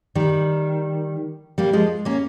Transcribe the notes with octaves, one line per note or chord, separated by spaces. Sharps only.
D#3 G3
G3 A#3
F3 G#3
A#3 C#4